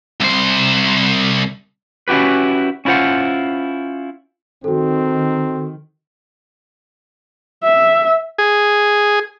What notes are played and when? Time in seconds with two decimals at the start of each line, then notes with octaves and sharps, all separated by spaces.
0.21 C2 C5
2.08 C#4 E4 F#4 G4 B4
2.85 C#4 E4 F4 C5 F#5
4.64 D#3 C4 F#4 A4
7.63 E5
8.38 G#4